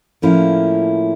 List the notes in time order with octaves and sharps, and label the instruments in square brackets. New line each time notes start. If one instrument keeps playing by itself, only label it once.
[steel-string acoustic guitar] A2 F3 A#3 C#4 E4